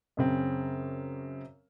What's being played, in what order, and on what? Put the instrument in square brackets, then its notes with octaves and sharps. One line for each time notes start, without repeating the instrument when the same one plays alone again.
[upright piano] F#2 C#3 C4